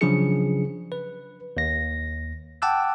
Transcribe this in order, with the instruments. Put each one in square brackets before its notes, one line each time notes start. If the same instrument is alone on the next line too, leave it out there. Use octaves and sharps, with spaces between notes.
[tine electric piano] C#3 F3 F#3 D4 G#4 C#7
B4
D#2 A#6
F#5 G5 A5 D6 E6 F#6